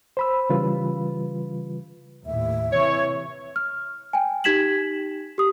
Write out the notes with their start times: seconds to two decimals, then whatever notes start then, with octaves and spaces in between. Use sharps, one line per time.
0.17 C5 B5 E6
0.50 C#3 E3 G3 F4 B4
2.26 D#2 A2 E5
2.72 C3 E3 C#5
3.56 F6
4.13 G5 G#5
4.44 D#4 G4 G#6 B6 E7 F#7
5.38 G4 D#6